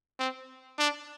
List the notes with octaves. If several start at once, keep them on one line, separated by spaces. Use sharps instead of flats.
C4
D4